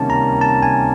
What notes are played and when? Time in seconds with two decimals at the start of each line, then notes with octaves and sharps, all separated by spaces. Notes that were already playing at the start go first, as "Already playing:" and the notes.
Already playing: C3 D#3 G3 A#3 C#4 A5
0.10 A#5
0.41 A5
0.63 G#5